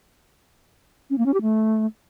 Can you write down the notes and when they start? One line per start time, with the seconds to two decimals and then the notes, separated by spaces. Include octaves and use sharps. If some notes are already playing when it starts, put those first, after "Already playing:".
1.10 C#4
1.18 A#3
1.26 C#4
1.34 G4
1.42 A3